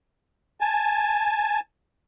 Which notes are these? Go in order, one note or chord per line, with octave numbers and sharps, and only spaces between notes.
G#5 A5